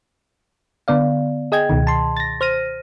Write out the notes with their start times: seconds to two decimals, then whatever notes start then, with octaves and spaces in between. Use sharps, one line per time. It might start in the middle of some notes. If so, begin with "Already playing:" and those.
0.88 D3 B3 D5 F5
1.52 G#4 D#5 G5 G#6
1.69 C#2 B2 D#3
1.87 A5 C6
2.17 A6 A#6
2.41 C5 F6 A#6 D#7